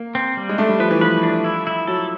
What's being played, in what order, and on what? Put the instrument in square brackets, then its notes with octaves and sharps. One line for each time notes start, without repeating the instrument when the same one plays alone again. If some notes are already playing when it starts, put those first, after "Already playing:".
Already playing: [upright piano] A#3
[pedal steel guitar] C4
G3
[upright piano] G#3
[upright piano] A3 [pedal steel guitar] D4
[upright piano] G3
[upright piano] F3 [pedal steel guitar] B4
[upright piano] E3
[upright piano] F3 [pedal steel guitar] B4
[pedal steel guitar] D4
E4
E4
[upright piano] F#3 [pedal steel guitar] A4